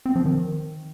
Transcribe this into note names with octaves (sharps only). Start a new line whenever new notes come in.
C4
F3
D#3